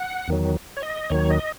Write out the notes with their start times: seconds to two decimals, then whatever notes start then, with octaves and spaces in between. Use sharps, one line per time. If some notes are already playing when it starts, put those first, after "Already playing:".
Already playing: F#5
0.28 E2 D#3 F#3
0.77 C#5
0.83 D#5
1.10 D#2 D#3 F#3 C#5
1.30 D#5